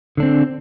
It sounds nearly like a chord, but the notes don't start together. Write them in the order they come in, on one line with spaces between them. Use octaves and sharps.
D3 D4 C4